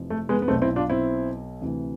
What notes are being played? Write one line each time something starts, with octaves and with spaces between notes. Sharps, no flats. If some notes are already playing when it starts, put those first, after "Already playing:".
Already playing: F1 F2 C3 E3
A3
G#3 B3
B3
B1 B2 A3 C4
C4 E4
D4 F4
C4 E4
D2 C3 E3